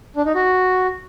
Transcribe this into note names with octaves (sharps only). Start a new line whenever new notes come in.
D4
D#4
F#4